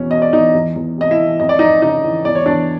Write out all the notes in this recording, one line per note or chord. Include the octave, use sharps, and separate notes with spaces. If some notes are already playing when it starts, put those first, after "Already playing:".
Already playing: E2 B2 C#4
B2 D#5
D5
E2 D#4 D#5
E2
E2
C3 D#5
E4 E5
E3
F2 D#5
D5
F2 D#4 D#5
C#3 D#4 D#5
E3
E2 D5
C#5
E2 D4 D5